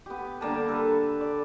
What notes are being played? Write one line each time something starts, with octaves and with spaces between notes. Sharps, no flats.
B3 G4
D3 G3 A#3 A5
A4 B4
D5